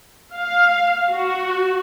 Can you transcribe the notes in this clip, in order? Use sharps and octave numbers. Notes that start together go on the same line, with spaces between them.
F5
F#4